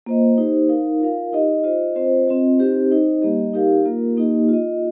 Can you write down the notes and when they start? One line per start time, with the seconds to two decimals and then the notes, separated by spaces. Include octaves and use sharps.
0.06 A#3 F4 C5 D#5
0.37 D#4 G4 C5
0.69 D#4 A#4 F5
1.00 F4 A#4 F5
1.33 D#4 G4 D#5
1.64 F4 C5 D#5
1.95 C4 F4 C5 D#5
2.28 C4 F4 D#5
2.58 C4 D#4 G4 C5
2.91 D#4 C5 D#5
3.22 G3 A#3 G4 D#5
3.53 D#4 G4 A#4 F5
3.85 A#3 F4 A#4
4.17 A#3 D#4 G4 D#5
4.48 F4 D#5